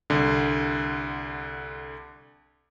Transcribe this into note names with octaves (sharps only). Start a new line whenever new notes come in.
C2 D3